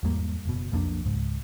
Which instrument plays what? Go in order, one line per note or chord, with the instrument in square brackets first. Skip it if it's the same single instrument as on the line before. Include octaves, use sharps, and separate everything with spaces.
[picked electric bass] E2 G#2 G3 A#3
F#1 B2
B1 F2 A#3 D4
C#2 G#2